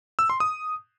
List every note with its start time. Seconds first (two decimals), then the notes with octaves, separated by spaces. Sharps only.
0.19 E6
0.30 C6
0.40 D#6